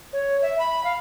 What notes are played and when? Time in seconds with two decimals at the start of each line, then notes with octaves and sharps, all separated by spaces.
0.13 C#5
0.42 E5
0.59 B5
0.84 F5